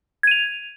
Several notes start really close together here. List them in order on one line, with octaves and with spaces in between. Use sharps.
G#6 D#7 F7